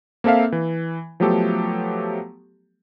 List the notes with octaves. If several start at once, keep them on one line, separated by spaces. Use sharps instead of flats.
A#3 C4 A4 E5 F5
E3
F3 F#3 A3 B3 G4 A4